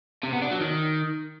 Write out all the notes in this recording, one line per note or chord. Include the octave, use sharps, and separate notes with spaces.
C3
B3
D4
F#3
D#3